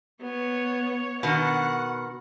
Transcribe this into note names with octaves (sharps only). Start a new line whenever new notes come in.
B3 C#5
B2 D#3 F#5